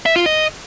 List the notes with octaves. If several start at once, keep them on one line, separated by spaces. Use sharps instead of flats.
E5
F4
D#5